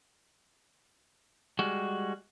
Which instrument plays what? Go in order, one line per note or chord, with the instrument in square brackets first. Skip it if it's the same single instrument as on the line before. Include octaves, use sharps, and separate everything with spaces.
[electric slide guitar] G3 G#3 F#4